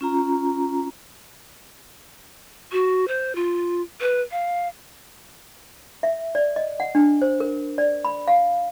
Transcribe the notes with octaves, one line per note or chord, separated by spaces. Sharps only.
C#4 F4 A#5
F#4
C5
F4
B4
F5
E5
D5
D#5
F#5
D4
C5
A#4
D5
B5
F5